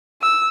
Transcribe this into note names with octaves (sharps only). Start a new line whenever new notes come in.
E6